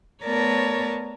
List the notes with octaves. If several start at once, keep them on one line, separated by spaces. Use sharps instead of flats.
A3 B3 A#4 C#5 D5 A5